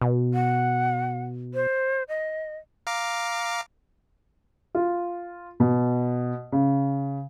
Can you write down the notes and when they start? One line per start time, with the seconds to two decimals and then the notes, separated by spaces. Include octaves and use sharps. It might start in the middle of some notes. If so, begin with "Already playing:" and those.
0.01 B2
0.34 F#5
1.54 C5
2.09 D#5
2.87 F5 A#5 D6
4.75 F4
5.60 B2
6.52 C#3